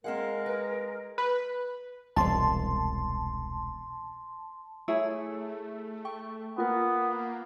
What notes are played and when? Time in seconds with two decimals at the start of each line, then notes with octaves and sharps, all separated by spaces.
0.04 G#3 C4 A#4 F5 F#5
0.46 B4
1.18 B4
2.16 E1 C2 A5 C6
4.88 A3 E4 G#4 C#5 E6
6.05 G5 C#6
6.58 A#3 B3 F4 A#4